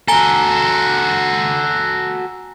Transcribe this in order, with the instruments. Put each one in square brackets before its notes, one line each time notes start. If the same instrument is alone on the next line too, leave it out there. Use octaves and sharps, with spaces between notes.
[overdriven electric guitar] F#4 A4 [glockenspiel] G#5 A#5 G7